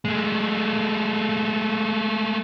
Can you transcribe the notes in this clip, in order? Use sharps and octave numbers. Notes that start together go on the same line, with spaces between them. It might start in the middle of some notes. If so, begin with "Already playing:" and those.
G#3 A3